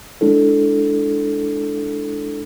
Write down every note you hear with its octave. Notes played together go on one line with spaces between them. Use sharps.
G#3 D4 E4 A4